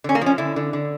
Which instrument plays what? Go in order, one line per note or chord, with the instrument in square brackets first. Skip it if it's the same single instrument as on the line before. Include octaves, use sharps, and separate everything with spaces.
[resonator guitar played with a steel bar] D3 C#4
A#3
F3 C#4
D3 E4
D3
D3